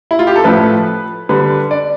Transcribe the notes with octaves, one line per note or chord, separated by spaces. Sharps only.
E4
F4
G4
A4
A2 F3 A3 B4
D3 G3 B4
D5